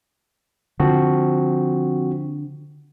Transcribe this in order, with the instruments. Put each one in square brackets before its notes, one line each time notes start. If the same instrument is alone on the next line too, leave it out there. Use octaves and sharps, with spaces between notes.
[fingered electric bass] D3 [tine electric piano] F3 C4 F#4